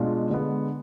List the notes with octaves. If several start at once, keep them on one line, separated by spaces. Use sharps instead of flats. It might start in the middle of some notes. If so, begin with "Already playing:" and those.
Already playing: B2 G#3 D4 F4
D3 G#3 B3